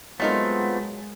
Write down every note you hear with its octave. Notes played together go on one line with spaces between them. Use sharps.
F#3 G#3 A3 B3 C4 D#4 F4 A#4